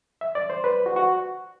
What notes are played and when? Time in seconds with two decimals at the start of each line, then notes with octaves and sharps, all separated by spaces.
0.21 E5
0.35 D5
0.50 C5
0.64 B4
0.86 F#4
0.96 F#4